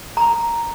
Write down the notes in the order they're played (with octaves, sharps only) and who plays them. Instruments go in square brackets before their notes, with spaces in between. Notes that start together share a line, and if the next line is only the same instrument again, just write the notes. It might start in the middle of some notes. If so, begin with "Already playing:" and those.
[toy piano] A#5